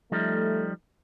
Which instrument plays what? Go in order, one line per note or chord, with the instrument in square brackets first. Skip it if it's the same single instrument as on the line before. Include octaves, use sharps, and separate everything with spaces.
[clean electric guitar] F3 G3 D#4 [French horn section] A3